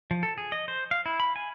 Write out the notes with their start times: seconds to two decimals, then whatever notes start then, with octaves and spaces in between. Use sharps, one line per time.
0.11 F3
0.23 A4
0.38 G#4
0.52 D#5
0.68 C5
0.91 F5
1.06 E4
1.20 B5
1.36 G#5